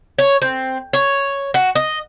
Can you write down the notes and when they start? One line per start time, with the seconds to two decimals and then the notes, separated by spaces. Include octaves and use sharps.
0.18 C#5
0.42 C4
0.93 C#5
1.54 F#4
1.75 D#5